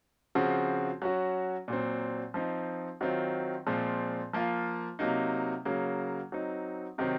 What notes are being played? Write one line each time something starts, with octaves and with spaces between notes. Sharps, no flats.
C#3 F3 C4 F#4
F#3 C#4 F#4
A#2 F#3 C4
F3 C4 D#4
D#3 F#3 C4 F4
A#2 F3 G#3 C4
F3 A#3 F4
C3 F#3 A#3 D#4
C#3 F#3 A#3
F#3 C4 D#4
C3 D#3 F#3 C4